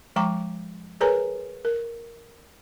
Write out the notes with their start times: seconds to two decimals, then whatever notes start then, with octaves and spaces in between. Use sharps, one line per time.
0.16 F3 G#3 G5 A#5 C#6 D6
1.01 G#4 A#4 B4 C#5 G#5 A#5
1.65 A#4